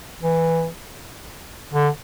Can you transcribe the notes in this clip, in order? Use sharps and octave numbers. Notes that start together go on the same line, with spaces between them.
E3
D3